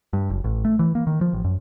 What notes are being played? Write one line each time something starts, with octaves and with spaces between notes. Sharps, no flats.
G2
F#1
A1
A3
E3
A#3
D#3
F3
A1
F#2